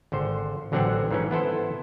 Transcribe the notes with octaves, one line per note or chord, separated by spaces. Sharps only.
G#1 D3 C5
A1 D3 F#3 C4 D4 F#5
G#2 E3 C#4
B3 E4 A4 C5